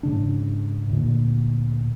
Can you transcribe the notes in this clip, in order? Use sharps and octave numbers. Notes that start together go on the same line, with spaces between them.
G#2 C#3 D4
D2 A#2